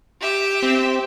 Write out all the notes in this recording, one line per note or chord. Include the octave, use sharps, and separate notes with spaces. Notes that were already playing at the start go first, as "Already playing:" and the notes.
G4 E5
C4